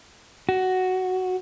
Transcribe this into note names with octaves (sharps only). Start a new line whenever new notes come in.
F#4